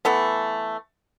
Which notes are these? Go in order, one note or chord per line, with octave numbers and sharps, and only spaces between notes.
E3 A3 B3